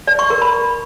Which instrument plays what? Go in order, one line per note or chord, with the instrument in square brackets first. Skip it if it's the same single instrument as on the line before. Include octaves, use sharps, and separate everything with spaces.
[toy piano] D5
C#6
A#4
B5